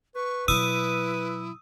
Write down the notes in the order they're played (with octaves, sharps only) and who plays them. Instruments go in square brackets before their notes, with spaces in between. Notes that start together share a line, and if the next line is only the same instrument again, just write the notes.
[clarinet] B4 [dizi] C#6
[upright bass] B2 F#3 [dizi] E4 [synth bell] D#6 E6 D#7